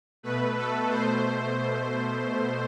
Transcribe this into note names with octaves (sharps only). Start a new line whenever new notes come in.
B2 A3 B4
A4
B2 A3 C5